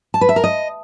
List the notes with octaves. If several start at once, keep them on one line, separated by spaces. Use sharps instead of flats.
A5
B4
E5
A#4
D#5